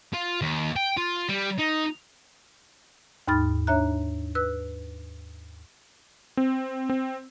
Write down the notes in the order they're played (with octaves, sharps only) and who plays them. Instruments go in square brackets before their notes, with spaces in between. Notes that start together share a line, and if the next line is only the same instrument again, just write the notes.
[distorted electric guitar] F4
D#2
G5
F4
G3
D#4
[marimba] D#2 G#2 D#4 B5 F6 A6
D4 C#5 E5 A#5 F#6
B4 E6 F#6
[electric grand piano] C4
C4